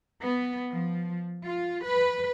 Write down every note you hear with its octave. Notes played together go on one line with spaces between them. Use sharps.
B3
F3
F4
B4